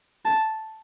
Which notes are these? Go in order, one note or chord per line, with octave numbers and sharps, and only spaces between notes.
A5